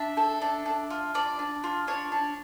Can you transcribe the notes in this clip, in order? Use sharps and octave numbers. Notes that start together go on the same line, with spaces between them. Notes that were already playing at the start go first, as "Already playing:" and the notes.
Already playing: D4 E5
A4
D4
D4
F4
D4 D5
D4
F4
D4 C#5
D4